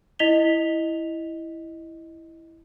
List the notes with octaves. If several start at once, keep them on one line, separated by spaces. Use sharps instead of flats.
E4 D#5 B6 F7 G7